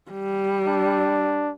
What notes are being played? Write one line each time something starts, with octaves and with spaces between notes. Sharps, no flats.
G3
D4